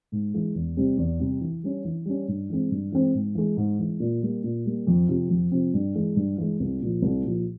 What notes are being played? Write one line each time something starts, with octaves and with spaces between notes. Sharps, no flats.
G#2
E3 G#3
E2
C3 G3 C4
E2
C3 G3 C4
E3
G3 C#4
E3
G3 C#4
G2
E3 G#3 C4
G2
E3 G#3 C4
G#2
E3 G#3
G#2
E3 G#3
A#2
G3 A#3
A#2
G3 A#3
F2
C3 F3 C4
F2
C3 F3 C4
G2
E3 G#3
G2
E3 G#3
C2
A#2 F3
C2
A#2 F3